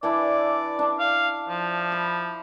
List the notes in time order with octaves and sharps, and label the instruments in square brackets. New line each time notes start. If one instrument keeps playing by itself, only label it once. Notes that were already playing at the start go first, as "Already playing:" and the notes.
[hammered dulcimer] E3 D4 E4 [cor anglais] D5
[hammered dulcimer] D4
[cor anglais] F5
F3
[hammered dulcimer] B5